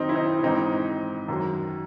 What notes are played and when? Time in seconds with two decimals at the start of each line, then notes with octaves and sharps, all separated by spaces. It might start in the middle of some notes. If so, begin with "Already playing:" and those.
Already playing: F#2 D#3 F#3 C4 D#4
0.09 E4
0.15 C4 D#4
0.39 E4
0.43 G#2 E3 C4 D#4
1.28 F#2 D#3 F#3